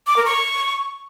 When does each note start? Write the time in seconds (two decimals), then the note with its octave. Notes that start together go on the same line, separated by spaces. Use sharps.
0.07 D6
0.16 A#4
0.26 C#6